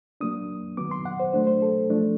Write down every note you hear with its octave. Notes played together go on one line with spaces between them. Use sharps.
F#3 A#3 D4 D#6
D#3 F#3 B3 D6
C6
F#5
C5
F#3 A3 D4 C5
C5
A4
F3 A3 D4